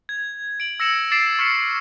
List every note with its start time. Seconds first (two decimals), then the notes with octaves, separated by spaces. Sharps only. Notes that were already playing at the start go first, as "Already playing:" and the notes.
0.09 G#6
0.60 D7 F#7
0.80 E6 A#6 C#7 E7 F#7
1.11 D6 A6 C7 D7 E7
1.39 C#6 F6 A6 B6 C#7 E7